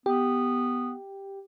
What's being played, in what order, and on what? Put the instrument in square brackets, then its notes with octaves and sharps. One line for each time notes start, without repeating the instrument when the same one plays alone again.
[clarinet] B3 [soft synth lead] G4